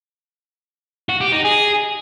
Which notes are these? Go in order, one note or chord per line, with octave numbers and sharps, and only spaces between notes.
F#4
G4
D#4
G#4